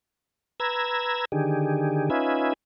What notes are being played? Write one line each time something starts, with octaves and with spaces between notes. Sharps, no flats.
B4 A#5 E6 G#6
D3 D#3 G4 G#4
C#4 D#4 F4 B4 E5 G#5